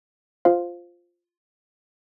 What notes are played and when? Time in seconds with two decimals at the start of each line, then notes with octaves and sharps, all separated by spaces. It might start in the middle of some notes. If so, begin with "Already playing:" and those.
0.45 F4 C5 F5